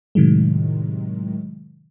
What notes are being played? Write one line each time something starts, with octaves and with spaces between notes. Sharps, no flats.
A2 C3 D#3 F#3 G#3